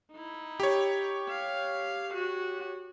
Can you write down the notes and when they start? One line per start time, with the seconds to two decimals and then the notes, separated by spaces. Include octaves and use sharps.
0.12 D#4 E4
0.60 G4 C#5
1.28 F5
2.14 F#4